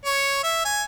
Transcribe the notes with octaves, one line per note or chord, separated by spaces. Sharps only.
C#5
E5
G#5